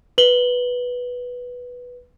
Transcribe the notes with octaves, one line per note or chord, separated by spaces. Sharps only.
B4 F#7 G7